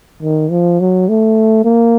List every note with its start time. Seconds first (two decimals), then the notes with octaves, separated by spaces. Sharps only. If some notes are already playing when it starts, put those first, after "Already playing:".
0.22 D#3
0.51 F3
0.80 F#3
1.08 A3
1.64 A#3